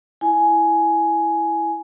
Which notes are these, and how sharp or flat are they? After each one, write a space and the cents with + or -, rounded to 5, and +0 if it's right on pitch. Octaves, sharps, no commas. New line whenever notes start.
E4 +5 G#5 +10